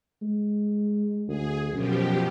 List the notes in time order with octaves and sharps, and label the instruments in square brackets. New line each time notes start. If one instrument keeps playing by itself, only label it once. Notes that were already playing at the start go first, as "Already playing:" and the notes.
[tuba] G#3
[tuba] D2 [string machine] G#4
[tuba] F#2 [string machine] B2 F3 G4